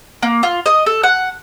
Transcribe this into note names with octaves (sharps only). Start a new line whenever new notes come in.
A#3
F4
D#5
A4
F#5